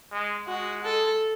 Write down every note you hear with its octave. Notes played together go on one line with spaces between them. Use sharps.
G#3
G#3 F#4
A4